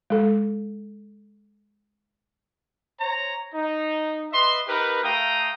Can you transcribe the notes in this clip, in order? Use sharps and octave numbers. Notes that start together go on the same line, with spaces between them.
G#3 A4
C5 C#5 A#5
D#4
B4 D#5 E5 C6
D#4 G4 A#4 B4
A3 F5 G5 A#5 D#6